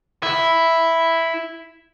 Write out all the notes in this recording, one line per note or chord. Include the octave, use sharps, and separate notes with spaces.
E4